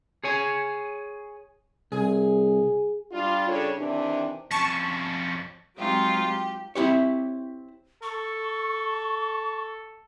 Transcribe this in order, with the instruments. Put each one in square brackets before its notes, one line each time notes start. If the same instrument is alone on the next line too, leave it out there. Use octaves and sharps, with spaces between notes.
[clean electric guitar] G#4 C#5 G#5
[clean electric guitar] C2 [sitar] G#4
[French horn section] G3 D4 F4
C#3 G3 D4 A4 C#5
C3 D#3 E3 D4
[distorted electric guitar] F2 C#4 [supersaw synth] A5 C#6
[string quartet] F#3 G#3 C4 D#4 F4 G4
G4
[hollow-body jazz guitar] C4 E4 G4 C#5
[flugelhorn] A4 [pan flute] C#6